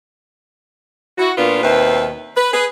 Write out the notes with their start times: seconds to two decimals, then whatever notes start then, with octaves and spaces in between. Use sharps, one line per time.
1.18 E4 F#4
1.37 A#2 A#3 B3 D4 F4
1.63 D#2 B2 C4 B4 E5
2.36 B4
2.53 G#4 B4